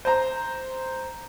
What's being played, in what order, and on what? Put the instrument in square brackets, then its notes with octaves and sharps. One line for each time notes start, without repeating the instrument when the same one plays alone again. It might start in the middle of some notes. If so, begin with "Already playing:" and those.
[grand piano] C5 A#5